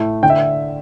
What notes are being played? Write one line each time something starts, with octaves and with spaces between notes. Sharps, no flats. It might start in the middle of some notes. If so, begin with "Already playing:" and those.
Already playing: A2 A3
D3 G5
E5